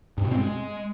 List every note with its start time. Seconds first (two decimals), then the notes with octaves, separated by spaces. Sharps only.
0.18 G2
0.24 B2
0.31 C4
0.38 G#3